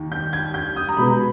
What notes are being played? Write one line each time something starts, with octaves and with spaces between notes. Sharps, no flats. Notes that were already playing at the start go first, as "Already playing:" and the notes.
Already playing: D#2 D#3
G6
G#6
G6
D#6
A#5
B2 G#3 B3 B5